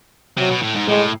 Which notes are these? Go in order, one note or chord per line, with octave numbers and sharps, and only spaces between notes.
C3 F#3
B2
A2
G#2
A2 G#3